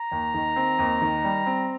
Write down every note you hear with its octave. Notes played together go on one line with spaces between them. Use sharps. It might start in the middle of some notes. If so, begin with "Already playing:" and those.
Already playing: A#5
D#2
D#3
C4
D#2
D#3
G3
C4